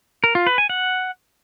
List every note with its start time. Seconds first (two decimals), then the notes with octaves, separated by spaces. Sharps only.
0.24 A#4
0.35 F4
0.47 B4
0.58 G#5
0.69 F#5